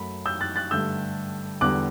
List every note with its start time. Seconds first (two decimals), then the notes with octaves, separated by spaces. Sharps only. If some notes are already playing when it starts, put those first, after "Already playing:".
Already playing: F#2 F#3 A3 B5
0.26 E6 G6
0.41 F#6 A6
0.56 F#6 A6
0.71 G2 D3 A3 E6 G6
1.61 E2 D3 G3 D6 F#6